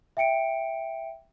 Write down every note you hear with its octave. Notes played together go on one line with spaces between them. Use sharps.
E5 G5 C#7 D7